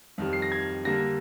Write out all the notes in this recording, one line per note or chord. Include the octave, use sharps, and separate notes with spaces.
F2 D#3 G3
C7
A#6
G#6
D3 G3 A#3 A#6